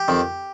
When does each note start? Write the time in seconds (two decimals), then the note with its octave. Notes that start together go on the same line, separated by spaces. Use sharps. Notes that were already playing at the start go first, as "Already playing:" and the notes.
Already playing: G4
0.08 F2 D#3